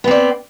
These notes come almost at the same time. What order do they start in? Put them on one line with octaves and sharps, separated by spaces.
B3 C4 D5